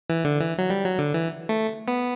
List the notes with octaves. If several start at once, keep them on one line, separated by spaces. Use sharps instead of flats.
E3
D3
E3
F#3
G3
F#3
D3
E3
A3
B3